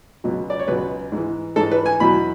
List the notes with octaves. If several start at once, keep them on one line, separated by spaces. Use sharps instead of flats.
C#2 B2 F#3
D5
C#5
C#2 B2 F#3 B4
G#2 E3
G#2 E3 A4
B4
G#5
E2 B2 F#3 B5